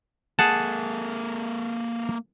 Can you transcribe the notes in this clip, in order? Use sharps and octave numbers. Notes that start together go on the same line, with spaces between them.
A#3 G#4 A4 F#5 A5